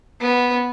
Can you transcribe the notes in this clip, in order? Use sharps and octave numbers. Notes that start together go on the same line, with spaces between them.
B3